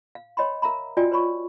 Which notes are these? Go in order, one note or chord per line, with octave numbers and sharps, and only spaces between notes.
F5
C#5 D#5 G5 B5 C6
A#4 E5 F5 A#5 B5
F4 F#4 D5 D#5 G5 G#5
B4 C#5 B5 C#6